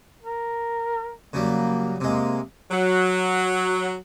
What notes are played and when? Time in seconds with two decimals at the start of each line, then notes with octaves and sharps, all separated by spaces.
0.23 A#4
1.33 C#3 F#3 G3 A#3
2.00 C3 G#3 A#3
2.71 F#3